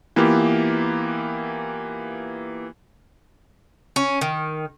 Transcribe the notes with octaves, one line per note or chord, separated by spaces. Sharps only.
E3 A#3 B3 E4 F4 G4
C#4
D#3